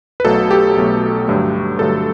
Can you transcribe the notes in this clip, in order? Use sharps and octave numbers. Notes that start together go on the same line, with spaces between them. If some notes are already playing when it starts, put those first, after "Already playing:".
B4
B1 B2 F#3 A3 A4
G4
B1 B2 F#3 A3
G2 D3 F#3 A3
G2 D3 F#3 A3 A4